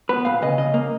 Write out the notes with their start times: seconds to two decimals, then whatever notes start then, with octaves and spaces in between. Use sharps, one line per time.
0.09 B3 B4
0.25 A#2 F5
0.42 C#3 D#5
0.58 C#3 D#5
0.74 A#3